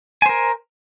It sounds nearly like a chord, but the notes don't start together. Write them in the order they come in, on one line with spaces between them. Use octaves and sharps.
G#5 C5 A#4